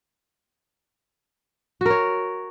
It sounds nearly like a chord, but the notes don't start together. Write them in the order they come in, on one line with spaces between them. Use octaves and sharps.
F#4 A#4 C#5